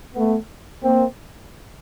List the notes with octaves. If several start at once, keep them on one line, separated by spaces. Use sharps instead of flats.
A3 B3
A#3 C4